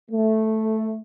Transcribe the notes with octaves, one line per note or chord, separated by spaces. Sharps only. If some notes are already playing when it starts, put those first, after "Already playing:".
A3